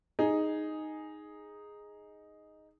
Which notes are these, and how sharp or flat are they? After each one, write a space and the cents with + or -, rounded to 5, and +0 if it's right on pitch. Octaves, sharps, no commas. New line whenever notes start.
D#4 +0 G#4 +0